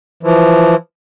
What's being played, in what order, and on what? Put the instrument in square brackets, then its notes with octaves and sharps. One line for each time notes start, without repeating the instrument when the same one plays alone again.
[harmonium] E3 F3